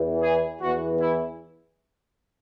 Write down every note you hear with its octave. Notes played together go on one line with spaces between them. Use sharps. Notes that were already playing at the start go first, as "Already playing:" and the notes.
Already playing: E2 E3
G#4
E2 E3 F#4
E4